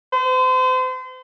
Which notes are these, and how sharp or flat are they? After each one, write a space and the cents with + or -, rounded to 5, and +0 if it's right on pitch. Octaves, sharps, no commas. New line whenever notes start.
C5 -35